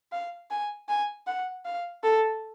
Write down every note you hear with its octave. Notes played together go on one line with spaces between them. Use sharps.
F5
G#5
G#5
F#5
F5
A4